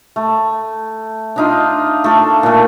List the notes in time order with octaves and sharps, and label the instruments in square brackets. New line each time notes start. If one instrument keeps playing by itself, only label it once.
[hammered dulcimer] A3
D4 D#4 F4
A3 F4 A4
A#2 A3